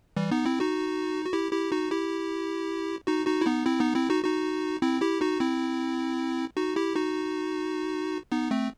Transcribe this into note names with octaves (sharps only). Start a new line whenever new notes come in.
E3 G3
B3 D#4
C4 E4
D#4 F#4
F#4
E4 G4
E4 G4
D#4 F#4
E4 G4
D#4 F#4
D#4 F#4
E4
B3 D#4
C4 E4
B3 D#4
C4 E4
D#4 F#4
D#4 F#4
C4 E4
E4 G4
D#4 F#4
C4 E4
D#4 F#4
E4 G4
D#4 F#4
B3 D#4
A3 C4